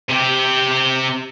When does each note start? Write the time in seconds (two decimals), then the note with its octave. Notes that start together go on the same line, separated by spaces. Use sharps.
0.10 C3 G4